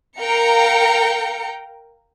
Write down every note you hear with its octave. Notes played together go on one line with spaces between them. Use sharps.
A#4 F5 G5 A#5 C#7